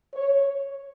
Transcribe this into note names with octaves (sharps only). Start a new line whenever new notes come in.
C#5